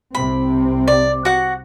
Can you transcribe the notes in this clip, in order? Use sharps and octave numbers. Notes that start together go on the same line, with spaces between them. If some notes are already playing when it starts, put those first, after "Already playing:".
C2 C3 C4 B5
D5
F#4 F#5